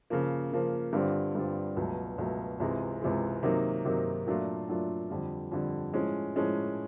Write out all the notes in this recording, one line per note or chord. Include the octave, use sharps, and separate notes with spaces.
C#3 F3 A#3
C#3 F3 A#3
G2 D3 G3 C4 F4
G2 D3 G3 C4 F4
C#2 B2 F#3 A3
C#2 B2 F#3 A3
C#2 C3 E3 G#3
C#2 C3 E3 G#3
C3 D#3 F#3 A#3 D#4
C3 D#3 F#3 A#3 D#4
A#2 F#3 A3 D4 F4
A#2 F#3 A3 D4 F4
F2 D3 G3
F2 D3 G3
A2 F3 G#3 C#4
A2 F3 G#3 C#4